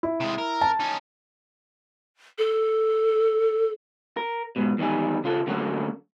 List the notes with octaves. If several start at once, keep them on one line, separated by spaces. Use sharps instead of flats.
E4
C3 G#3
A#4
A5
C#4 D#4
A4
A#4
G#2 B2
E2 D#3 G3 D#4 G#5
C#3 F4 A4
D3 F#3 A3 A#3 C#4 F#4